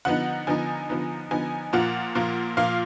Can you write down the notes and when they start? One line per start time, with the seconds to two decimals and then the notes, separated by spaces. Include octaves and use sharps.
0.05 D3 F3 B3 D#4 F#5
0.47 D3 F3 B3 D#4 G#5
0.89 D3 F3 B3 D#4
1.31 D3 F3 B3 D#4 G#5
1.73 A#2 F3 A#3 F4 F#5
2.15 A#2 F3 A#3 F4
2.57 A#2 F3 A#3 F4 F5